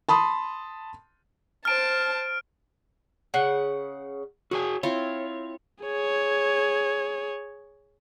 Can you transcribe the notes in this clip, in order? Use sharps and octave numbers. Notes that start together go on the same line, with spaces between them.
A5 B5 C6 D#6
C5 A5 F6 D7
C#3 F#5
F#4 G#4 C#5 G#5
C4 E4 F4 C#5
G#4 C#5